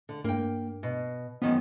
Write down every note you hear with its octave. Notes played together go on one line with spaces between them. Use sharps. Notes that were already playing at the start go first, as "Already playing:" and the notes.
D3
G2 A#3 G5
B2
F#2 D#3 F3 B3